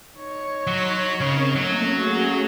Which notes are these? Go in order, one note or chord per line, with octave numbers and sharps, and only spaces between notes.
D#4 C#5
F#3 C6 B6
C#3 C4 A#4
F#3 A3 A#3 C#4
F#4 G#4